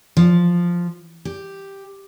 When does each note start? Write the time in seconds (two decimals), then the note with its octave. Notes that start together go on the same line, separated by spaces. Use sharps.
0.17 F3
1.25 G4